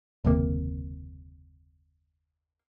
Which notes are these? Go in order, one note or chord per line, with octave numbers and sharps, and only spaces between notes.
F#1 D#2 C3 A#3